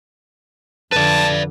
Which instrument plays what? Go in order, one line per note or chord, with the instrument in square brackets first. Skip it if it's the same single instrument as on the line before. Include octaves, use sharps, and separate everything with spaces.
[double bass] F2 D3 [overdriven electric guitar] B4 D5 [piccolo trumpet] A5